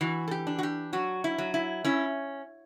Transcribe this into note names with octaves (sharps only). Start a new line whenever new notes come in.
E3 F#4
A4
G4
D4
F#4
G4
F#3 F#4
E4
F#3
E4
C#4 E4